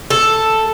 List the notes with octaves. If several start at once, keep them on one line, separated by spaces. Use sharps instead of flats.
A4